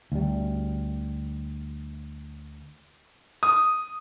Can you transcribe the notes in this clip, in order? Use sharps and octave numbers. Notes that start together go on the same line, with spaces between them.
D2 G3
D#6